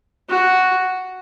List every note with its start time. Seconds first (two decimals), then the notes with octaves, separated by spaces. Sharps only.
0.29 F#4